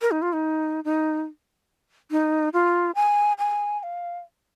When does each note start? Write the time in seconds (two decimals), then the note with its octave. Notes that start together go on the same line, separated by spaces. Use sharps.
0.02 A#4
0.11 D#4
0.22 F4
0.33 D#4
0.85 D#4
2.11 D#4
2.53 F4
2.95 G#5
3.38 G#5
3.80 G#5
3.83 F5